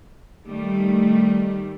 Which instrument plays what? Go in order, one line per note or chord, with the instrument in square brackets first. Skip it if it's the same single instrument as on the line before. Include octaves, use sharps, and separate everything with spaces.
[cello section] D#3 G3 A3